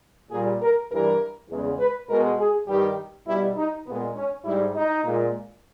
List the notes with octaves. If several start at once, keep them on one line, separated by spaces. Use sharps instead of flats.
A#2 G3 G#4
A#4
G2 E3 G3 A#4
E2 C#3 G#3
B4
B2 G#3 A#4
G#4
G2 D#3 G3 G4
B2 G3 E4
D#4
A#2 G#3 B3
C#4
G#2 G3 E4
D#4
A#2 G#3